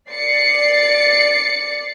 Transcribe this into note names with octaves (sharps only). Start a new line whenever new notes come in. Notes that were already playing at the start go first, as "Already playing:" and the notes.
D5 A6 C7 C#7